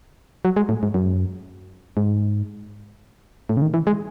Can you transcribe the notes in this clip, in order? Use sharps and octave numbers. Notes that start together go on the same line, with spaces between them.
F#3
G#3
A2
G#2
F#2
G#2
A2
C#3
D#3
E3
G#3